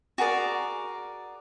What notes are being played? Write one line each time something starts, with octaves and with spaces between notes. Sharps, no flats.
F#4 G#4 A#4 D5